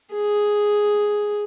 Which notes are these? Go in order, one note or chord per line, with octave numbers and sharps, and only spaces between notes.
G#4